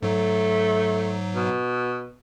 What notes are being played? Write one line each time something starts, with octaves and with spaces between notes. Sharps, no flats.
G#2 F#3 A3
B2